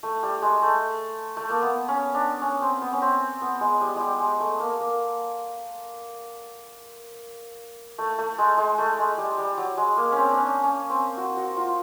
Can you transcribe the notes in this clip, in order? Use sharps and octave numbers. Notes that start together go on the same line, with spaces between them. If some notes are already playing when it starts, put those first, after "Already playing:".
A3
G3
G#3
A3
A3
A#3
B3
C#4
D4
C#4
C4
B3
C#4
C4
B3
G#3
G3
G3 G#3
G#3
A3
A#3
A#3
A3
A3
G#3
G#3
A3
G#3
G3
G3
F#3
G#3
A#3
C4 C#4
D4
C#4
C#4
C4
F#4
F#4
F4